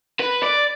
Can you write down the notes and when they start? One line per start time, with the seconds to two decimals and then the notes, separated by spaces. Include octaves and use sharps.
0.20 B4
0.43 D5